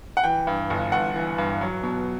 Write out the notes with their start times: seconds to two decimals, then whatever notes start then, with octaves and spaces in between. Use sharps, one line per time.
0.17 F#5
0.24 E3 G5
0.47 G2
0.70 G1
0.92 G1 F#5
1.16 E3
1.38 G2
1.61 F#3
1.83 B2